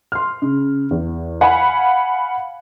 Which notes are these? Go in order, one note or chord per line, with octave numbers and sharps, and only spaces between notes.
C6 F6
C#3
E2
F5 F#5 G#5 B5